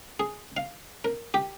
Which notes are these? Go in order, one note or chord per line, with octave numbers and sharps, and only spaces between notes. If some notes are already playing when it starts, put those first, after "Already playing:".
G#4
F5
A#4
G4